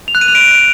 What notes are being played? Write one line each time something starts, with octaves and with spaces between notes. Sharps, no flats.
F7
F#6
D#7
F7
D7